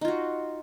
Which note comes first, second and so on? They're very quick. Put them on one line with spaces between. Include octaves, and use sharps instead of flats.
D#4 F4 F#4